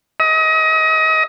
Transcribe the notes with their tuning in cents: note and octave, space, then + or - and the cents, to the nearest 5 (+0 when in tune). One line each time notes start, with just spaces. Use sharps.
D#5 +30